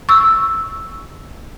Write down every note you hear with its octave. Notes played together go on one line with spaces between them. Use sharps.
C#6 E6